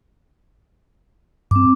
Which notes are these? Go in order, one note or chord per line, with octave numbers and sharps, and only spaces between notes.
G2 C4 D6